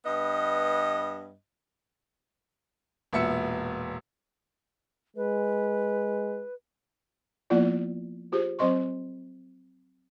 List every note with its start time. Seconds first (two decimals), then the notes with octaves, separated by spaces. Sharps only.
0.06 G2 B3 D#5
3.13 E1 A#2 B3 E5 E6 C#7
5.16 G#3 B4
7.50 F3 A#3 B3 E4 F4 D5
8.32 F4 G4 G#4 C5
8.59 F#3 C4 C5 D#5 C6 C#6